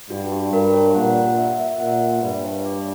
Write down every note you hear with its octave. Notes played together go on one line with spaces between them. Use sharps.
G2 F#4
G4
G2 A#4
C#5
A#2 F#5
F#5
E5
E5
A#2 F#5
E5
G2 B4
C#5
D5